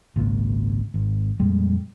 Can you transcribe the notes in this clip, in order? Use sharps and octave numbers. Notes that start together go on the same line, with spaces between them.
G#1 C#2 A#2
G#1
F2 A#2 G3 G#3